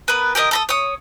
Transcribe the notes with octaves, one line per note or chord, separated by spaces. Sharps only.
B3 A#4 B4
G4 A4 A#4 D#5
A4 A#5 D#6
C#5 D#6